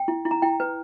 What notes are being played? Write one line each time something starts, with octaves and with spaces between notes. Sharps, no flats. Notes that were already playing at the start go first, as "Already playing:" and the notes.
Already playing: G5
E4
E4
A#5
E4 G5
B4